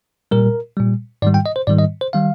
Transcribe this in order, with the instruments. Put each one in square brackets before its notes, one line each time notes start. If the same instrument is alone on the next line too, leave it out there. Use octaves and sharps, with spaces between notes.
[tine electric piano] A#2 G3 A#4
A#2 G3
G#2 D#3 G3 D5
G5
D#5
C5
G#2 D#3 G3 D5
D#5
C5
D#3 G3 F5